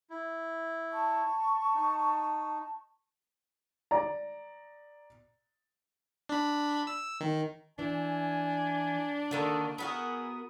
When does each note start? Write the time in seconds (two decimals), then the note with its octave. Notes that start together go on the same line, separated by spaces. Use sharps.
0.10 E4
0.92 A5 C#6
1.75 D#4
3.91 D5 A#5
6.29 D4 B5
6.87 E6
7.21 D#3
7.79 E3 D4 G#5
9.31 D3 D#3 A#3 D#4 F#4 A4
9.78 B3 E4 F#4 G#4 A#4 D#6